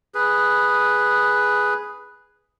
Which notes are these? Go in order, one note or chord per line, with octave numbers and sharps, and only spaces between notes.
G#4 B4